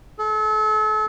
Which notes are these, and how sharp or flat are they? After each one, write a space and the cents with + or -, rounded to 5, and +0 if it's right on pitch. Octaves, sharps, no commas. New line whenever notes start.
A4 -40